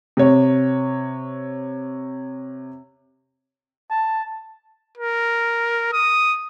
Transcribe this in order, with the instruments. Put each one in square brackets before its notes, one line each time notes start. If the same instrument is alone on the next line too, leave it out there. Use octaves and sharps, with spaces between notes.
[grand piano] C3 C#5
[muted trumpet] A5
[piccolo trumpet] A#4
D#6